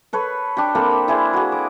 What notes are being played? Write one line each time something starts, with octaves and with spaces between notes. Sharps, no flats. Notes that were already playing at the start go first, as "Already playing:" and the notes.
A4 B4 C#5
D4 G4
A#3 C4 A4 B5
E4 G#4 C5 D5
F#4 G#4
D6